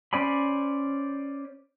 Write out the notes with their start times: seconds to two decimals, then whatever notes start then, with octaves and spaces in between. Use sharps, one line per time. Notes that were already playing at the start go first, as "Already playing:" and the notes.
0.13 C#4 C5 D5 G#5 B5